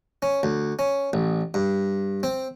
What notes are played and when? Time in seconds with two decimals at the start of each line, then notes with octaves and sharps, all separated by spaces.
0.22 C#4
0.43 D2
0.79 C#4
1.13 A1
1.54 G2
2.23 C4